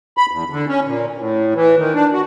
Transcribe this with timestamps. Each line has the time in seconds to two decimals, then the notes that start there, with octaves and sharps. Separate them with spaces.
0.17 B5
0.31 E2
0.50 D3
0.68 C#4
0.85 A#2
1.18 A2
1.55 E3
1.78 D#3
1.94 D4
2.12 F#4